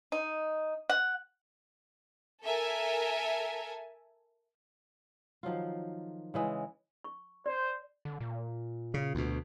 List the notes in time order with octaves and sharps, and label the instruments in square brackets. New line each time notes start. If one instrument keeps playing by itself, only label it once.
[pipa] D#4
F#5
[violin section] A4 A#4 E5 G#5
[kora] D#3 F3 F#3 F4
C#3 E3 G#3
[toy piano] C#6
[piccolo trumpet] C5 [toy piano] D5
[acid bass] D3
A#2
[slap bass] C#3
D2 B2